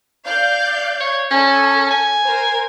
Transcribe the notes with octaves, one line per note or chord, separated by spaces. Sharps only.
D5 F5 G6
C#5
C#4 A4
G#5
A#4 C5